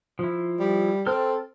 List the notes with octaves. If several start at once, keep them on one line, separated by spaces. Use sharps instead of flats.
F3 E4
G3
C4 A4 F6